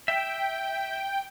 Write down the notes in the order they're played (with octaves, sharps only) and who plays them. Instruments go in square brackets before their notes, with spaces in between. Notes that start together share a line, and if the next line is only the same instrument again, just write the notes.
[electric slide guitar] E5 [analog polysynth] G5